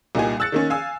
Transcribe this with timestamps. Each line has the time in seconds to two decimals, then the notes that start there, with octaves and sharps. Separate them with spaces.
0.15 C2 A#2 D#4 G4 G#5
0.40 E6 F#6 A6 C#7
0.52 D#3 A#3 C#4
0.70 F5 G#5 E6